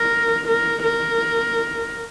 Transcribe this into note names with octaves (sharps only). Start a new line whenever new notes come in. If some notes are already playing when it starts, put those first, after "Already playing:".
Already playing: A#4
A#4
A#4